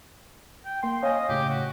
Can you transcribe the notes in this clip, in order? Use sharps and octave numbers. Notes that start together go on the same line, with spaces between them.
G5
A#3 G5 C6
C#4 D#5 F5 G#5
A2 C#3 G4
F#4